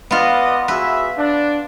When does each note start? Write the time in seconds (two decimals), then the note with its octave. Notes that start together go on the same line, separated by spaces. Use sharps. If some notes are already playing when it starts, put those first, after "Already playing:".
0.11 B3 F4 B4 D5 D#5
0.68 F#4 G#4 B4 E5
1.16 D4